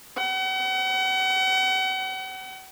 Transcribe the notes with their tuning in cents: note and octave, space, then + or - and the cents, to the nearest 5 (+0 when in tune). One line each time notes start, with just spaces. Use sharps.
F#5 +40